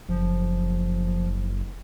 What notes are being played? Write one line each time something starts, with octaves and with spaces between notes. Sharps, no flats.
F#1 F3